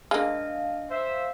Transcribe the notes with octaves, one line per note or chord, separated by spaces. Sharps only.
G#3 A#3 D4 D#5 F5 G#5
C5 E5